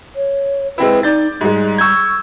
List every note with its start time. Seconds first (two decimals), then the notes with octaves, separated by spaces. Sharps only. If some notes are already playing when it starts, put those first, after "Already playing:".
0.16 C#5
0.78 G#3 C4 E4 B4
1.03 D#4 D5 G6 A6
1.41 G#2 G3 G#3
1.78 C#6 E6 G6 G#6